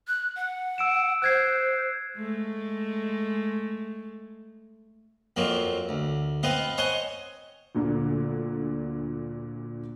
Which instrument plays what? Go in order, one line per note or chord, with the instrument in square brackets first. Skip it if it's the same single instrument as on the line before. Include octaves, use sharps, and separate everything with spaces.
[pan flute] F#6
F#5
[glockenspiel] E6 D7 E7
[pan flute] C5 [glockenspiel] F#6 G#6 C7
[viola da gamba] G#3 A3
[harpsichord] F2 F3 F#3 A#3 C4
D2
B3 C4 B4 D#5 F5
C5 C#5 D#5 F#5 G#5 C6
[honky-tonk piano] D2 A#2 D3